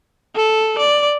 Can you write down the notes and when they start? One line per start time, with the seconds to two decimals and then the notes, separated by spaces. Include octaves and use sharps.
0.36 A4
0.78 D5